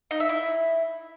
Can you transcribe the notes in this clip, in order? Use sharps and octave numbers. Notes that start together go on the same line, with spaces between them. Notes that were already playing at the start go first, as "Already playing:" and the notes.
D#4
E5
E4